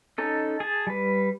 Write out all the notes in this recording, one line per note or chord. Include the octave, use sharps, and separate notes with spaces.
C#4 D#4 A4 D#5
G#4 A5
G3 B4